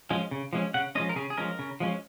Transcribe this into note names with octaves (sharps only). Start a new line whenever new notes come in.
F3 G#3 C#4
C#3
F3 G#3 C#4
C#3 F#5
F3 G#3 C#4 D#5
A#4
C#3 G#4
G#4
F3 G#3 C#4 A#4
C#3
F3 G#3 C#4